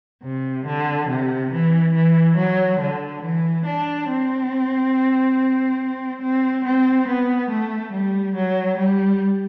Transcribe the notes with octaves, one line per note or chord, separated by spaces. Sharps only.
C3
D3
C3
E3
E3
F#3
D3
E3
D4
C4
C4
C4
B3
A3
G3
F#3
G3